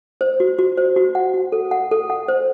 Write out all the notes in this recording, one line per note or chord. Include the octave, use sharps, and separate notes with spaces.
C5
F#4
F#4
C5
F#4
F#5
F#4
A4
F#5
A4
F#5
C5